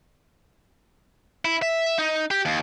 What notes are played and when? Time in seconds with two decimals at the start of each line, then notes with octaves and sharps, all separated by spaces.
1.45 E4
1.62 E5
1.98 D#4
2.31 G4
2.45 D#2